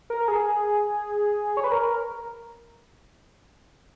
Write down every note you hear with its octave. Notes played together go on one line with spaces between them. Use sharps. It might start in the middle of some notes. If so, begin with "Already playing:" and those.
A#4
G#4
C#5
B4
A#4